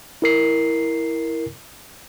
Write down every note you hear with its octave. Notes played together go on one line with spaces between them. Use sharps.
E4 A#4 C7